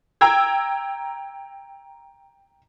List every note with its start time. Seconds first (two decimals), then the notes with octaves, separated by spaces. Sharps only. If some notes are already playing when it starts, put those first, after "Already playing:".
0.21 G5 A#5 E6 G#6